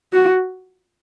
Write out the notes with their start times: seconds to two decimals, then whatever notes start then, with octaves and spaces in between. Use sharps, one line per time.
0.13 F#4